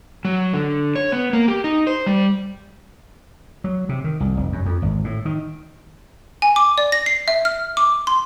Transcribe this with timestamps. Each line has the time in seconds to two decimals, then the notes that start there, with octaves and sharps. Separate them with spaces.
0.25 F#3
0.54 D3
0.96 C#5
1.12 B3
1.33 A#3
1.48 G4
1.64 D#4
1.87 C5
2.07 G3
3.64 F#3
3.89 C3
4.04 D#3
4.20 C2
4.37 F1
4.52 F#2
4.66 F2
4.82 G#1
5.04 A2
5.25 D#3
6.42 G#5
6.56 D6
6.78 D5
6.92 A#6
7.06 C7
7.28 E5
7.45 F6
7.77 D6
8.07 C6